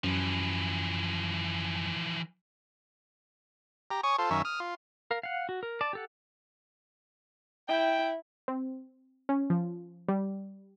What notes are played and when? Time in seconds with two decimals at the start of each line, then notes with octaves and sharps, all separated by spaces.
0.04 F#2 E3 F3
3.91 G4 A#5
4.03 C#5 G#5 C#6 D#6
4.19 F4 A4 C5
4.30 F#2 D#3 C#4 E5
4.45 D#6 F6
4.60 F4
5.11 A#4 F5
5.23 F5 F#5
5.49 F#4
5.63 A#4
5.81 D5 A5
5.93 G4 A4 F#5
7.69 E4 G5
8.48 C4
9.29 C#4
9.50 F3
10.08 G3